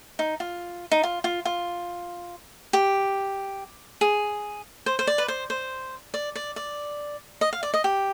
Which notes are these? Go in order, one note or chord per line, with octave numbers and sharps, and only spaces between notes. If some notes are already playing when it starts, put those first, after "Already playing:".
D#4
F4
D#4
F4
F4
F4
G4
G#4
C5
C5
D5
B4
C5
C5
D5
D5
D5
D#5
F5
D5
D#5
G4